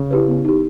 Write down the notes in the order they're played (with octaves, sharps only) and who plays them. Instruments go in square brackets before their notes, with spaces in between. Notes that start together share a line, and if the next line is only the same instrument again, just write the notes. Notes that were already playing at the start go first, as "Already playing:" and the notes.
Already playing: [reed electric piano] C#3
[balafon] E4 G4 B4
B3
D#4 G4